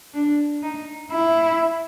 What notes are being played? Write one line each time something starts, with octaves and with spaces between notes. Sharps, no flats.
D4
D#4
E4